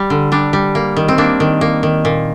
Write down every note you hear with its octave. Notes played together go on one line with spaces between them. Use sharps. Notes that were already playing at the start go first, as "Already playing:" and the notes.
Already playing: G3
D3
G3 D4
G3
A#3
D#3
C4
A#3 D4
D#3
A#3
D#3
A#2